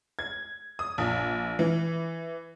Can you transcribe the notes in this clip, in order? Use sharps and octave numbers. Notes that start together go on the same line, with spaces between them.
G#6
D#6
A#1
E3